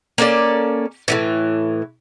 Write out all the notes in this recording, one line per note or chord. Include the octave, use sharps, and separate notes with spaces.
A#3 C#4 A4 D5
A2 C#3 E3